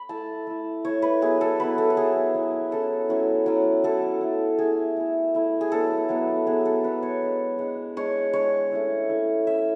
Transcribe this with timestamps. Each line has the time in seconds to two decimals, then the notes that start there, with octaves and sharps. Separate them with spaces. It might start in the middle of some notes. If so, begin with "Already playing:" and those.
Already playing: B5
0.09 A3 E4 A5
0.47 A3 E4
0.85 A3 E4 C#5
1.02 B4
1.21 F#3 B3 E4 G#4
1.41 A4
1.60 F#3 B3 E4 B4
1.78 A4
1.90 A4
1.97 F#3 B3 E4 G#4
2.35 F#3 B3 E4
2.71 F#3 C#4 E4 A4
3.09 F#3 C#4 E4
3.46 F#3 C#4 E4
3.84 F#3 C#4 E4 A4
4.21 A3 E4
4.59 A3 E4 G#4
4.97 A3 E4
5.34 A3 E4
5.61 G#4
5.72 F#3 B3 D4 A4
6.09 F#3 B3 D4
6.47 F#3 B3 D4 G#4
6.65 A4
6.84 F#3 B3 D4 B4
7.03 C#5
7.22 G#3 D4
7.59 G#3 D4
7.97 G#3 D4 C#5
8.33 G#3 D4 C#5
8.72 A3 C#4 E4
9.09 A3 C#4 E4
9.46 A3 C#4 E4 E5